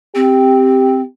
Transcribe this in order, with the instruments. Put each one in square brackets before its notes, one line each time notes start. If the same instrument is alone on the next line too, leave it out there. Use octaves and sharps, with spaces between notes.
[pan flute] C4 [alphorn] G4